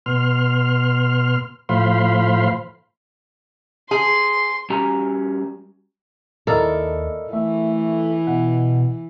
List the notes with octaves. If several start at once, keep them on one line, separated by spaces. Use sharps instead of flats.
B2 C6 F6
A2 F3 C5 F5 B5 C6
G#4 C6
G3 C#4 F#4 G4 G#5 A#5
D#2 E4 A4 A#4 D5 D#5 F5
E3 A3 E5
B2 F#5